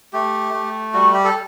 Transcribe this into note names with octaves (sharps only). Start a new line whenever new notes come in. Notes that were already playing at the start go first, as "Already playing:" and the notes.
A3 G4
A3
G3 F#4
G4
A4